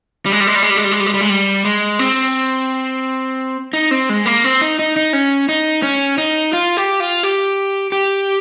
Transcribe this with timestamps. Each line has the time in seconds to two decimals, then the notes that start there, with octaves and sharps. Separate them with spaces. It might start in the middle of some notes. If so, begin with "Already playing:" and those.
0.26 G3
0.32 G#3
0.40 G3
0.47 G#3
0.55 G3
0.62 G#3
0.70 G3
0.77 G#3
0.84 G3
0.91 G#3
1.00 G3
1.06 G#3
1.14 G3
1.21 G#3
1.30 G3
1.65 G#3
1.99 C4
3.73 D#4
3.91 C4
4.09 G#3
4.26 A#3
4.44 C4
4.61 D#4
4.79 D#4
4.97 D#4
5.13 C#4
5.49 D#4
5.83 C#4
6.18 D#4
6.53 F4
6.77 G4
7.00 F4
7.23 G4
7.92 G4